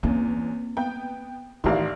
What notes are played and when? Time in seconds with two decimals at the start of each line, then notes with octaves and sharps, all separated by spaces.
0.03 E2 A#3 C4 C#4
0.77 B3 G5
1.64 A1 D#3 E3 D5 F5 C6